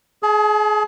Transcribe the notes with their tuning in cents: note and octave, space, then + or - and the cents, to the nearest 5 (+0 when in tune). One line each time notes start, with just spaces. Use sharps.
G#4 +25 A5 -35